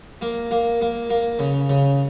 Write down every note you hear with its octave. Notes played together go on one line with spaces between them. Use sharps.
A#3
A#3
A#3
A#3
C#3
C#3